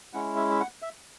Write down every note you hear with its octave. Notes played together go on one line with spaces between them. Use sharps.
G#3 C#4 E4 F#5
E5
E5
F#5
E5